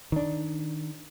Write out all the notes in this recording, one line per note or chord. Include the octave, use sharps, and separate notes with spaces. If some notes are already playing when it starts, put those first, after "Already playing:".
D#3 D4